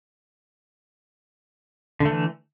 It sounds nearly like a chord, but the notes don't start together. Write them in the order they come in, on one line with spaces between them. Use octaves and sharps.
D3 A3 E3